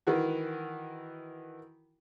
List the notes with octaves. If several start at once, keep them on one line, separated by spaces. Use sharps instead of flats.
D#3 E3 F#4